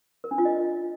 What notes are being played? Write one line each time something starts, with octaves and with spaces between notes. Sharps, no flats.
A#4
D4
F4
D#5